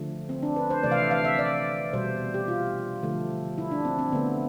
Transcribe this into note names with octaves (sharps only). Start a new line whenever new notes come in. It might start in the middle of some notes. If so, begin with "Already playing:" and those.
Already playing: D3 F3 A3
C4
D4
B4
C5
C3 E3 A3 D5
F5
E5
F5
E5
D5
B2 G3 C5
G4
F4
D3 F3 A3
E4
D4
C4
C4
D3 A3 B3